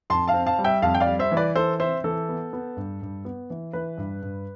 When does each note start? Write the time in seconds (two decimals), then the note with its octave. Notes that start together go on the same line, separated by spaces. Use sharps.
0.10 F2 A5 C6
0.28 F5 A5
0.34 C4
0.46 F5 A5
0.58 G3
0.64 E5 G5
0.82 F2 F5 A5
0.95 G5
1.00 D5 F5
1.07 G3
1.19 C5 E5
1.32 E3
1.37 B4 D5
1.55 E3 A4 C5
1.80 C4 C5 E5
2.04 E3 A4
2.29 B3
2.53 B3
2.76 G2
3.02 G2
3.25 B3
3.50 E3
3.73 E3 B4
3.98 G2
4.22 G2